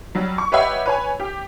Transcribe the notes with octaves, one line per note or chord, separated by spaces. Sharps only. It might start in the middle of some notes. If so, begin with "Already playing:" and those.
F#3 G3
C#6
G4 B4 C#5 D#5 E5 F#5
B4 C#5 G#5
G4